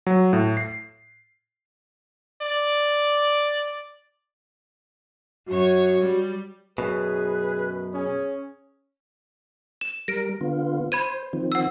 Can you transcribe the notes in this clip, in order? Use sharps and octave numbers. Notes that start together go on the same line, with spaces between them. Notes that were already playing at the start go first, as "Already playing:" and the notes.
F#3
A2
C7
D5
F#2 F#4 C#5
G3
F#2 B2 G#4 B4
C#4 G#4
E7
G3 A#4 A#6 D7
D3 B3 F4
C5 B5 G#6 D#7
D#3 F3 C4
F#5 E6